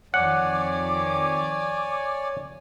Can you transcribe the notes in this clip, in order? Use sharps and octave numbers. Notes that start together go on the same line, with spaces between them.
F2 D#3 C#5 D5 F#5 G#5 D6